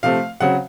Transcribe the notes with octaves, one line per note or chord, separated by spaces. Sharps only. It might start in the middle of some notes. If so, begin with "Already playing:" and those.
C3 F3 A3 C4 F5
C#3 F#3 C4 F#5